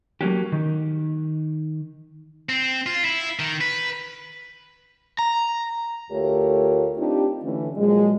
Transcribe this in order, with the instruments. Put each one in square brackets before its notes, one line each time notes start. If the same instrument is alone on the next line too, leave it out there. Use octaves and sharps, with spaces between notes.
[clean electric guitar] F#3 A3 A#3 C#4 F#4 G4
D#3
[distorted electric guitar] C4
F4
E4
D#3
B4
[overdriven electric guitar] A#5
[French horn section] D2 A3 F4 G4 A#4 C#5
C4 D4 D#4 F4 G4
D3 E3 A3 C#4
A#2 F3 F#3 G#3